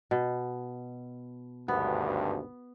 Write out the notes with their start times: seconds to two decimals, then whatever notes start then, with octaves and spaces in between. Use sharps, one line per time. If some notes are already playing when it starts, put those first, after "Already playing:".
0.11 B2
1.68 G#1 D2 G2 B3